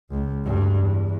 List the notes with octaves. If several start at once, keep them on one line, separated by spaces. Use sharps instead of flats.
C#2
D2 G2
E2